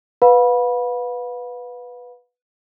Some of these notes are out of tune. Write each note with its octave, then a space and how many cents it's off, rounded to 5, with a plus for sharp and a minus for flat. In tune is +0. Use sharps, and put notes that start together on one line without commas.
B4 +0 F5 +40 B5 -20